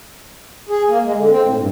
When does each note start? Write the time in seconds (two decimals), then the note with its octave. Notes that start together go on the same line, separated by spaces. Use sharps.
0.69 G#4
0.89 A#3
1.04 G#3
1.17 D3
1.30 C4
1.44 A2
1.58 G2